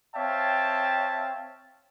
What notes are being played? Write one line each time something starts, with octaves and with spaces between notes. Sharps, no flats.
C4 C#5 E5 F5 G5 A5